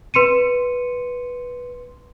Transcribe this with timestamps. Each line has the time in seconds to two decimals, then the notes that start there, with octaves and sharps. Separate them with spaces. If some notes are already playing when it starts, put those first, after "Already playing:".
0.14 B4 C6 C#7 D#7